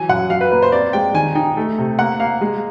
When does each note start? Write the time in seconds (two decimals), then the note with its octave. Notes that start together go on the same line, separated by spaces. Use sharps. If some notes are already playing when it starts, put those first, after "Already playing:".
Already playing: E3 F#3 G#5
0.09 F#2 F#5
0.30 F#3 F5
0.41 B4
0.51 A#3 B4
0.62 C5
0.72 C4 D5
0.93 G#3 G5
1.14 D#3 G#5
1.35 D#4 G5
1.57 A3
1.78 C3
1.99 A#3 F#5
2.20 A#3 F5
2.41 G#3